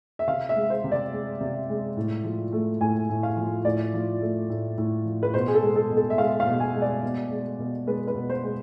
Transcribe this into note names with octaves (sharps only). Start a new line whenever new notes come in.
E5
C3 F5
E5
G#3
C5
C3
D5
G#3
C3
G#3
A2
F3
A3
A2 G#5
A2
F5
F3
A2 D5
F3
A3
A2
A2
F3
B4
B2 C5
G#4
A4
G#3
A4
B2
A4
E5
G#3 F5
F5
B2
G#5
G#3
D5
B2
G#3
B2
G#3 B4
B4
B2
C5
G#3